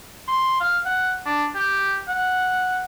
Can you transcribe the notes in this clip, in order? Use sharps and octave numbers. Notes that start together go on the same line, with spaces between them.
C6
F5
F#5
D4
G4
F#5